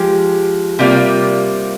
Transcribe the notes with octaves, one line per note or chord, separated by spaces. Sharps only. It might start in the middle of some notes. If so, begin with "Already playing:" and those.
Already playing: F3 G#3 G4
C3 G3 A#3 F4